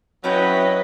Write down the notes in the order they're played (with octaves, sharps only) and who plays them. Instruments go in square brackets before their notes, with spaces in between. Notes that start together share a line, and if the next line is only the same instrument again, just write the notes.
[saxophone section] F#3 [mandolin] C#4 E4 G5 [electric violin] B4 D#5